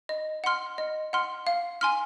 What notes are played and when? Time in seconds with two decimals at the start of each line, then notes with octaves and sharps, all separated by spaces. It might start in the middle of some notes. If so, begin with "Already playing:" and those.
0.09 D#5
0.44 F#5 C6 F6
0.78 D#5
1.13 F#5 C6 F6
1.47 F5
1.81 G#5 C6 F6